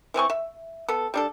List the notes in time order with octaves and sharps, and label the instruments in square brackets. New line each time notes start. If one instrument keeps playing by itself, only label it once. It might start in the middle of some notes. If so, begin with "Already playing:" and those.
[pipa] E3 C4 G#5 C#6
E5
B3 A4
G3 D4 A4